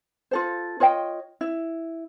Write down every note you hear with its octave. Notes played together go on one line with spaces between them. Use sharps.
F4 A4 C5
F4 C#5 D#5 G5
E4